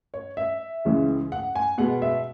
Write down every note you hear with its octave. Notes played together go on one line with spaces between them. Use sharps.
C#5
E5
C#2 C#3 E3 G#3
F#5
G#5
B2 G#3 B3 F#5
E5